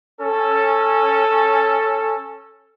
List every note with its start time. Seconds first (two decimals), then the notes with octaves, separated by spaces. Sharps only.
0.21 C#4 A4